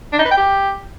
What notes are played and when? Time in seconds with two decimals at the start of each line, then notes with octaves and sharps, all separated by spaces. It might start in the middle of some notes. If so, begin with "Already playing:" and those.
0.13 D4
0.19 D#4
0.25 B4
0.31 G5
0.37 G4